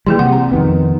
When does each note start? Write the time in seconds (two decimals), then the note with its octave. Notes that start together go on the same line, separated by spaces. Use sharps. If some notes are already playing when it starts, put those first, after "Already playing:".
0.06 E3 G3 A#3 G#4 C6
0.19 C3 F#5
0.32 A#5
0.52 F2 D#3 B3